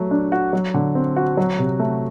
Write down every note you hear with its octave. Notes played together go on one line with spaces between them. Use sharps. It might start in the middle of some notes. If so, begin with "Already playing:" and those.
Already playing: F#3 A3
D4
F#4
F#3
D3
C4
F#4
F#3
C3
A3